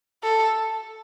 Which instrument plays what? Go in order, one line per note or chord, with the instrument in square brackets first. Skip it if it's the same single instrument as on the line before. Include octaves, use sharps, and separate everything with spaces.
[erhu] A4